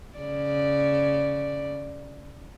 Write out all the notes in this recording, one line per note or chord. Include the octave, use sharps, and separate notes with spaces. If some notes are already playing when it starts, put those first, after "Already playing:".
C#3 D5